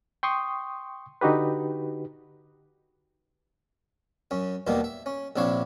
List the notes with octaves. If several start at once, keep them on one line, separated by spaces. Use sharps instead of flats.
G5 C6 C#6 D#6
D3 D#4 F#4 G4 B4
F#2 C#4
D#2 B2 D#3 G3 A#3
E5
C#4
A#1 C3 D4 E4 C#5 F5